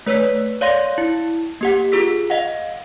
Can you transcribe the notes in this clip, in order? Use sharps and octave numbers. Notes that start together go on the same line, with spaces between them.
A3 B4 C#5 E6 B6
C#5 D5 F5 C6 A#6
E4
A#3 G4 F#5
F4 G#4 E6 B6
D#5 F5 F#5